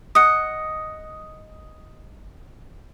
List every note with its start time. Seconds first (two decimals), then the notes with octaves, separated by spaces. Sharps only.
0.15 D#5 F#5 D#6 C#7